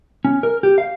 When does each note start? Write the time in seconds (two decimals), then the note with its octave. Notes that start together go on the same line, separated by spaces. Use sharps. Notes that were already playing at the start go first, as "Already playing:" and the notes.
0.25 C#4
0.43 A#4
0.63 G4
0.78 F5